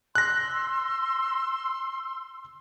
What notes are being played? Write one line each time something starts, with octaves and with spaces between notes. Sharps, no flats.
C6 E6 F#6 A#6